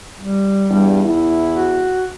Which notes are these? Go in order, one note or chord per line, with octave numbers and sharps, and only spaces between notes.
G3
E2 G2
E4
F#4